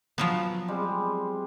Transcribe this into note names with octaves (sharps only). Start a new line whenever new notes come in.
F3 F#3 B3
G3 G#3 C4